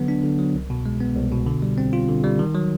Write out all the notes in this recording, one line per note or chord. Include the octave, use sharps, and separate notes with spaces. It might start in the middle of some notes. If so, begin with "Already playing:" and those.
Already playing: D3 F#3 B3
D4
D3
F#3
C2
B2
G#3
B3
C2
B2
D3
G3
C4
F4
D3
G3
D#3
F#3